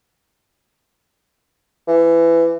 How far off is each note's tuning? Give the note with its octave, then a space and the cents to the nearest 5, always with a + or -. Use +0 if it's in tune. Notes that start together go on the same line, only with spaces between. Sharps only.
E3 +20